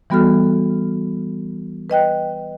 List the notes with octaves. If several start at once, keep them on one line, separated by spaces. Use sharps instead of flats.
E3 G3 B3 F#4 A4 F6
B4 D#5 G5 F#6